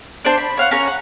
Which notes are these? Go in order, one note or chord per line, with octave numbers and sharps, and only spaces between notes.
D4 C5 D5
B5
C#5 F5 F#5
C#4 A#4 C#5
F#5